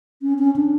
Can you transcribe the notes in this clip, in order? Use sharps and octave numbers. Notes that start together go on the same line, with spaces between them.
C#4
C#4
D4